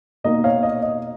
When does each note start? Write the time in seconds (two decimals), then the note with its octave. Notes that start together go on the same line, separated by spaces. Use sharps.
0.24 B2 A#3 D#4 D#5
0.44 C#5 F5
0.63 D#5
0.82 D#5